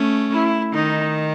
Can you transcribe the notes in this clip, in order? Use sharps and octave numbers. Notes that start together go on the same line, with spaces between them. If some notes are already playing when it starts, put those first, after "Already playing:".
Already playing: A3 C#4
E4
D#3 D#4